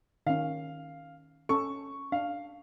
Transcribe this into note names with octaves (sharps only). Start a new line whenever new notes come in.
D#3 C#4 F5
C#4 A4 C#6
D4 F5